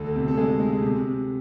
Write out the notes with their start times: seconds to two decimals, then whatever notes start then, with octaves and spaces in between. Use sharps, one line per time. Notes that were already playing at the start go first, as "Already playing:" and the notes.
Already playing: D2 A4
0.15 C3
0.28 A4
0.37 G#3 G#4
0.60 G#3
0.82 C3